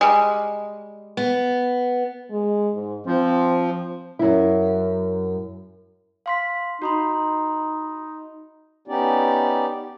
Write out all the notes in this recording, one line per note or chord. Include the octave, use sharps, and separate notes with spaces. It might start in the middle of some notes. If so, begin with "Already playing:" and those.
G3 G#3
B3
G#3
G#2
F3 C4
F#2 E4
F5 C6 B6
D#4 F#4 B5 C6
B3 C#4 D#4 G4 D5